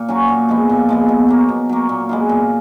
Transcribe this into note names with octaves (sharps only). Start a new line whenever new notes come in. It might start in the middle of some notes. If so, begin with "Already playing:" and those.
Already playing: A#2
F#3 C#4 F#4
A#2
F3 G#3 B3
A#2
F3 G#3 B3
B2
F#3 A#3
B2
F#3 A#3
A#2
G#3 B3 F4
A#2